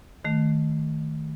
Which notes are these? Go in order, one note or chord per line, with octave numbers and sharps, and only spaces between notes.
D#3 A3